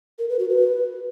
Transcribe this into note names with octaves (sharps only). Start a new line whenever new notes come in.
A#4
B4
F#4
B4